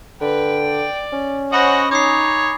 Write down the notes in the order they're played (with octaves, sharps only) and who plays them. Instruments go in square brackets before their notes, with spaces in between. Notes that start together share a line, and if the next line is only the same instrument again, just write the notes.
[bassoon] D3 [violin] B4 [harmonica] G5
[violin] D5
[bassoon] C#4
[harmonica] F#4 D#5 F#5 [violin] C5 C#5 [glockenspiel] G#5 B5 A#6
[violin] D#4 [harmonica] C#5 [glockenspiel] D6 D#6 C7